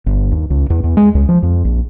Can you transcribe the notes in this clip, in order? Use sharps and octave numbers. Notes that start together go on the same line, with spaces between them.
G1
D#2
C#2
E2
E2
G#3
C#2
F3
F2
A#1